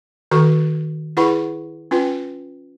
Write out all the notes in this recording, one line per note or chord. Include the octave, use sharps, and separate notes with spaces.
D#3 F#4 A4 C#6
E4 G#4 B4 F#5 B5 C#6
C#4 F4 B4 G5